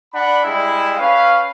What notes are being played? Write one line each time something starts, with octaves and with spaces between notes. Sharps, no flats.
D4 D5 F#5 B5
G3 G#3 E4
C#4 B4 F5